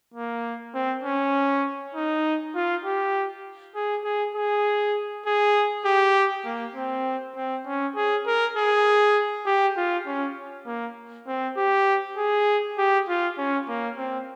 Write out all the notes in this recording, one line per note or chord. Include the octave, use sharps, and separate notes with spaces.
A#3
C4
C#4
D#4
F4
G4
G#4
G#4
G#4
G#4
G4
A#3
C4
C4
C#4
G#4
A#4
G#4
G4
F4
C#4
A#3
C4
G4
G#4
G4
F4
C#4
A#3
C4